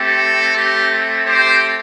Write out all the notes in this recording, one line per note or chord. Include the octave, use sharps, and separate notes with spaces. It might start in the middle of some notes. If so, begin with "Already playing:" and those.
Already playing: A3 C4 G4 A4
G4
G4 C5